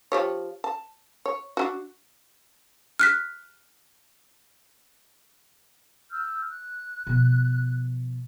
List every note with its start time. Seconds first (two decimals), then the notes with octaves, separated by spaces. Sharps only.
0.12 F3 G4 C#5
0.64 A5
1.25 C#5
1.57 D4 E4 F#4
2.99 F6 F#6 B6
6.10 E6 F6 G6
6.47 F#6
7.07 B2 F3